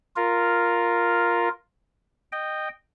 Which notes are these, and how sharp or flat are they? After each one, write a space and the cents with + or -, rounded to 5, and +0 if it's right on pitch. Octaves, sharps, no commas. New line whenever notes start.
F4 +0 A#4 +0
D#5 -15 G5 +0